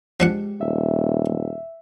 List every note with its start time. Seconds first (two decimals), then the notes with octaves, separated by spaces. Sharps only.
0.20 F3 G#3 D4 G4 F#5
0.61 D#1 E5